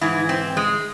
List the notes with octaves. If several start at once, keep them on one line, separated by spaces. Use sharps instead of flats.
G#2 E3 E4
C4
G#3